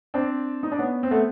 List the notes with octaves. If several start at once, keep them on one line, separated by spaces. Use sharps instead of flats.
C4 D4
D#4
D4
B3 C#4
C4
A3 B3